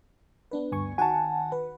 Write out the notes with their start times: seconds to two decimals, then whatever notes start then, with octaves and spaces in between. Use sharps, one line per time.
0.51 B3 D4 B4
0.72 D2 G2 G#5 C#6
0.98 D#3 F#4 F#5 G#5 A5
1.52 B4